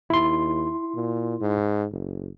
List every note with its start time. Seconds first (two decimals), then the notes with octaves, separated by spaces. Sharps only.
0.10 D#2 E4 C6
0.95 A#2
1.41 G#2
1.92 F#1